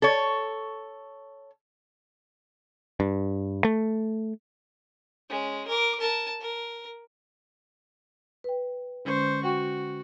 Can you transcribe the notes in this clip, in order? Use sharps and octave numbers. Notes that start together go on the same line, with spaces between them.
A4 C#5
G2
A3
G#3 C#4
A#4 D6
A#4 A5
A#4
B4 G5
D3 G#3 C#4 C5 C#6
F#4 F#5 G5 C#6